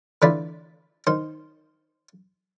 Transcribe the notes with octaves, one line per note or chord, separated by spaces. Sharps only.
D3 E3 A3 F4 D5 B5
D#3 C5